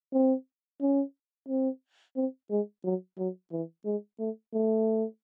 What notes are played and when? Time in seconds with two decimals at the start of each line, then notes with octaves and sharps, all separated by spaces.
0.13 C4
0.81 C#4
1.49 C4
2.16 C4
2.50 G#3
2.84 F#3
3.18 F#3
3.52 E3
3.85 G#3
4.19 A3
4.53 A3